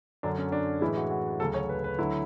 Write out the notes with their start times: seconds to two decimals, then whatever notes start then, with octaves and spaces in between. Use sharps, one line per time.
0.23 F#2 D3 F#3 D4
0.38 C#4
0.52 D4
0.81 A2 E3 G#3 E4
0.96 F#4
1.11 F#4
1.40 D2 C#3 F#3 A4
1.54 C#5
1.69 B4
1.84 B4
1.98 D2 D3 F#3 E4